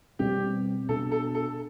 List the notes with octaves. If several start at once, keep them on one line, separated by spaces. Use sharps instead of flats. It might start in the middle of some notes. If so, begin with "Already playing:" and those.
B2 G3 C4 G4
B2 B3 D4 A4
A4
A4